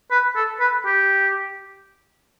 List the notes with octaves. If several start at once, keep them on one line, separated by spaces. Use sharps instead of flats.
B4
A4
B4
G4